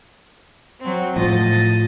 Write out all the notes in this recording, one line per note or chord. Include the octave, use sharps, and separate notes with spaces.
F#3 C4
A2 F3 D#5 A6